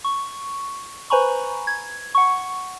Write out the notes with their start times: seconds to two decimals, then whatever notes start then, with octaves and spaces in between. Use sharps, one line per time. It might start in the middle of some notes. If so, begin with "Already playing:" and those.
0.04 C#6
1.10 B4 C5 G#5 A#5 B5 C#6
1.67 G#6
2.15 F#5 C#6